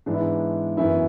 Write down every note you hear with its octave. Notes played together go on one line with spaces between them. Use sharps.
G#2 E3 G#3 B3 D4
E4
D4
F#2 E3 B3 E4